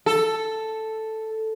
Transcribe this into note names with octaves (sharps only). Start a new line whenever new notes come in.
A4